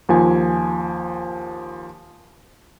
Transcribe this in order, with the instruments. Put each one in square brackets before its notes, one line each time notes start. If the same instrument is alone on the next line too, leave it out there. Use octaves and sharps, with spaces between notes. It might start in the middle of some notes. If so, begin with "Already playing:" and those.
[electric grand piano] D#2 F3 G#5